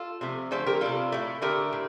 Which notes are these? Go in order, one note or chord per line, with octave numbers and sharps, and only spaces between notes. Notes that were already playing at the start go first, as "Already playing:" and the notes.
Already playing: F4 A4
C3 F3 A3
D3 F3 A3 A4 C5
G4 A#4
C3 G3 F4 A4
A2 A3
D3 A3 G4 A#4
A2